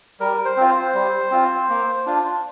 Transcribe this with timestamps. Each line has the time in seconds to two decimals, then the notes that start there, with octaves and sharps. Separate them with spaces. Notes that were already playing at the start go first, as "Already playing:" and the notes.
0.20 G3 A#4
0.45 C5
0.57 C4 F4
0.70 C5
0.94 G3
1.31 C4 F4
1.69 A#3
2.06 D4 F4